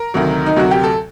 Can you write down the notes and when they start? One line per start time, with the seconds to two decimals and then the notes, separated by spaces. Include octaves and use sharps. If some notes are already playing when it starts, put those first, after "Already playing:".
Already playing: A#4
0.14 D2 C3 D#3 F#3
0.46 D#4
0.56 D2 C3 F#3 F#4
0.71 G4
0.84 A4